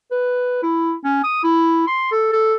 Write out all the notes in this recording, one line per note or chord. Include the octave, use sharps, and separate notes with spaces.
B4
E4
C#4
D#6
E4
C6
A4
A4